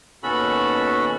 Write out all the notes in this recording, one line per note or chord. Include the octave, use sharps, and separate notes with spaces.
D#2 B2 C#4 F#4 A4 B5